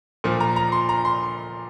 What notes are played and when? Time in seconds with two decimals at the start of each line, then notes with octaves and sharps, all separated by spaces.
0.24 A#2 F3
0.40 A#5
0.56 A#5
0.72 C6
0.89 A#5
1.05 C6